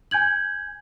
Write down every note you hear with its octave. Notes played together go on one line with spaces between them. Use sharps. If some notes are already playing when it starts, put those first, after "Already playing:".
G#5 G6 G#6 F#7